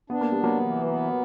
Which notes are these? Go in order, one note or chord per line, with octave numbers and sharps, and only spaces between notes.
B3 D4
A#3
G3 B3
F#3 A#3
E3
B3